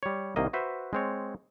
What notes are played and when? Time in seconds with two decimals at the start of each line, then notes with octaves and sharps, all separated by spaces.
0.03 G3 C#5
0.36 C2 D#3 A#3 D#5
0.53 F#4 B4 C5 E5
0.93 G#3 C4 C#5